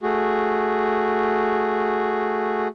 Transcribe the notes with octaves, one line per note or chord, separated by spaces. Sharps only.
A3 F#4 G#4